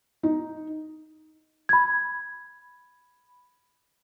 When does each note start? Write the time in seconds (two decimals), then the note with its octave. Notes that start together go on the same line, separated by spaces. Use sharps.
0.23 D#4
1.69 B5 G#6